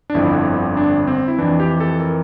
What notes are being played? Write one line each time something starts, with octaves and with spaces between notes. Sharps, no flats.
D4
G1 F2 D3 F3 E4
D4
C4
E4
F2 E3 D4
G4
A4
A#4